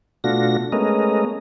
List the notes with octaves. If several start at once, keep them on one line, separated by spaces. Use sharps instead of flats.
B2 A3 D4 F4 F#4 A#6
G#3 A3 B3 C#4 A#4 D#5